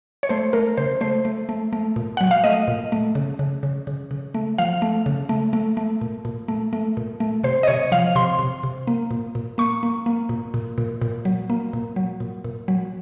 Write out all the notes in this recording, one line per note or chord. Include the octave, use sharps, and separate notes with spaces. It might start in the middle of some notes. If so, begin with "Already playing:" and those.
C#5
A3 C5
A3 A#4
C#3 C5
A3 C5
A3
A3
A3
A#2
F#3 F#5
F5
A3 D#5
A#2
A3
C#3
C#3
C#3
C#3
C#3
A3
F3 F5
A3
C#3
A3
A3
A3
A#2
A#2
A3
A3
A#2
A3
C3 C5
D#5
C3 C#5
F3 F5
C3 C6
C3
C3
A#3
A#2
A#2
A#3 C#6
A#3
A#3
A#2
A#2
A#2
A#2
F#3
A#3
A#2
F#3
A#2
A#2
F#3